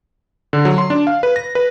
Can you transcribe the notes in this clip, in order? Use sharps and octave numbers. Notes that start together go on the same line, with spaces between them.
D3
F#3
C6
D4
F5
B4
A#6
B4